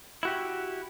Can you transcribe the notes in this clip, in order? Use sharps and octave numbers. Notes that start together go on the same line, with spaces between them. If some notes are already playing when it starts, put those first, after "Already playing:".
E4 F#4 G4